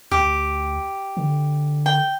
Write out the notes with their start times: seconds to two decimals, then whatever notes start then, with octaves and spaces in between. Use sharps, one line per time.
0.11 D2 G4
1.17 D3
1.86 G5